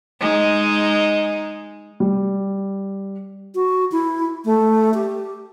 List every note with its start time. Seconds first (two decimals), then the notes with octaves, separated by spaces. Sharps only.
0.20 G#3 D#4
2.00 G3
3.55 F#4
3.92 E4
4.45 A3
4.94 G4